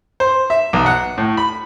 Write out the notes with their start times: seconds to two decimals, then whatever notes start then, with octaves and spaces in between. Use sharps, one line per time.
0.20 C5
0.50 E5
0.73 B1
0.86 F#5
1.18 A2
1.37 B5